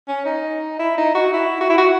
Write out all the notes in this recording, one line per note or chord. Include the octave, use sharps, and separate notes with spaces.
C#4
D#4
E4
D#4
F#4
E4
F#4
E4
F#4